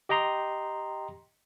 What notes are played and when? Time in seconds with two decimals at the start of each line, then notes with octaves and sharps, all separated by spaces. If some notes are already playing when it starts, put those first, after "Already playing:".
0.09 G4 D#5 G5 A#5 C6